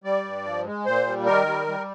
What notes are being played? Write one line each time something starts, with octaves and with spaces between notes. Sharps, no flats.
G3 D5
G2
F3
G#3
A#2 C5
G3
D#3 A#4
G3
G3